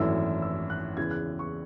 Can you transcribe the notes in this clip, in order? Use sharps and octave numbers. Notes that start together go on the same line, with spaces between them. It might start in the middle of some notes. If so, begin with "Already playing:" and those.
Already playing: G#1 F#2 E3 A3 E4 E6
E6
F#6
E2 C#3 E3 G#6
F#6
C#6